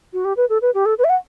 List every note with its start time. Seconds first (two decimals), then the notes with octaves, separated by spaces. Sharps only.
0.13 F#4
0.25 G4
0.37 B4
0.49 A4
0.62 B4
0.74 G4
0.86 A4
0.99 B4
1.04 E5
1.09 F#5